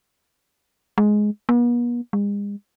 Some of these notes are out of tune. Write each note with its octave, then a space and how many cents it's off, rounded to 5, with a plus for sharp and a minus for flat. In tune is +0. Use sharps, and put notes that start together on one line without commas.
G#3 +10
B3 -45
G#3 -40